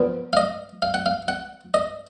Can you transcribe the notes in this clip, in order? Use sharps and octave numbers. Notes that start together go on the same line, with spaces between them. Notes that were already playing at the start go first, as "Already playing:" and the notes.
Already playing: A#2 F3 B3
F5
D#5
F5
F#5
F5
F#5
D#5